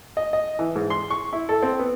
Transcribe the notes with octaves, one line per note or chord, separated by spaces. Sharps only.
D#5
D#5
E3
G#2
C6
C#6
E4
A4
C4
B3